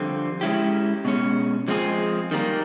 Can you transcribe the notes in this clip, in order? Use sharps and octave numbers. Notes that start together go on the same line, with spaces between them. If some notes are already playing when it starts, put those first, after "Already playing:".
Already playing: F2 D3 G3 C4
G#3 C#4 E4 G4
B2 G#3 C#4
F3 G#3 C4 F4 G#4
D#3 G3 A#3